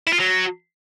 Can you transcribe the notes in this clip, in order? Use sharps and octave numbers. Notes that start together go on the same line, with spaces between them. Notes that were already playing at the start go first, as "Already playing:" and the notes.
E4
F4
F#3